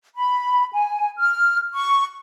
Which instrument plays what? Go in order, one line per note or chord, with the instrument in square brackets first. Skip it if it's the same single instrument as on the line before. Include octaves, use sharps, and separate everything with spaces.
[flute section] B5
G#5
F6
C#6